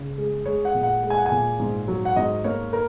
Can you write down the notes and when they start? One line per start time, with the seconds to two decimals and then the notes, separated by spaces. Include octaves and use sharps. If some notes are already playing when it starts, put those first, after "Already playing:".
Already playing: C#3
0.18 G#3
0.45 G#3 C#5
0.65 F#5
0.74 A#2
0.83 F#5
1.03 G#3
1.10 G#5
1.18 F#5
1.26 G#5
1.31 A#2
1.60 G#2
1.88 F#3
2.05 F#5
2.16 G#2 D#5
2.44 A#3 C#5
2.73 A#4